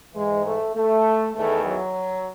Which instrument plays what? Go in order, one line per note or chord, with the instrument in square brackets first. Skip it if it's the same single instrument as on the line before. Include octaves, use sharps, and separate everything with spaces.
[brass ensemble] G#2 E3 G#3
A3
A3
E2 D#3 A3
F#3